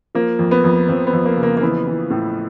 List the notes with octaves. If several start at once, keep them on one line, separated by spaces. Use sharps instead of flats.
F3 A#3
F2
B3
F2
F2 C4
B3
F2
A#3
C#3
A#3
A#3
E3 B3
E3
A2